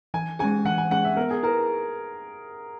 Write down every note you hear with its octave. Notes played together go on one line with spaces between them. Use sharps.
E3 G#5
G#3 C#4 G#4 G#5
E3 F#5
G#5
G#3 C#4 G#4 F#5
E5
B3 A#4
G#4
E4 G#4 A#4 B4